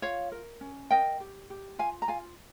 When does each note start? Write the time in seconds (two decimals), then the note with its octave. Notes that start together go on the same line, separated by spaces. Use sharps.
0.02 F4 C#5 F5
0.32 A#4
0.61 C#4
0.91 A#4 D#5 G5
1.20 G4
1.50 G4
1.79 F4 F5 G#5
2.02 A#5
2.08 F4 F5 G#5